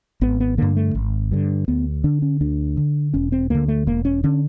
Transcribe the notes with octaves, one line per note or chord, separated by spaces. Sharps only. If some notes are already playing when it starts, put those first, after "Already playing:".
G#1 B3
B3
G2 D3 A#3
A3
G#1
G2 D3
D2 B3
D3 D4
C#4
D2 D4
D3
E1 C#4
C4
D2 D3 A#3
A3
E1 A#3
C#4
D3 C#4